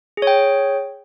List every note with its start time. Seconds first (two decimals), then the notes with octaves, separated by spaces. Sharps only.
0.17 G#4
0.22 C#5
0.27 G5